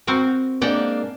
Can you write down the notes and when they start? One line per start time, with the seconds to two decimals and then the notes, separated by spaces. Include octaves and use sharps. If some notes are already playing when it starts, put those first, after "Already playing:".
0.07 C4 F#4 A#4
0.62 G#2 A#3 D4 D5 F#5 G5